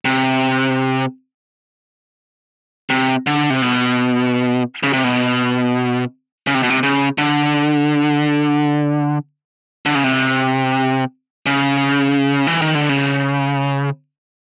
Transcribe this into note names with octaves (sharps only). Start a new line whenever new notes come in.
C3
C3
D3
C3
B2
C#3
C3
B2
C#3
C3
B2
C3
C#3
D3
D3
C#3
C3
C#3
E3
D#3
D3
C#3